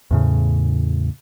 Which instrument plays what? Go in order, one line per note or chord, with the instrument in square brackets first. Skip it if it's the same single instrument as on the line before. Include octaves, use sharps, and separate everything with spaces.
[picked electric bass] E2 A2 C#3